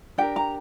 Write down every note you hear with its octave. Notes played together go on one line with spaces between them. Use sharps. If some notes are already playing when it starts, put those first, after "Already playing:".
D4 G4 A#4 G5
A#5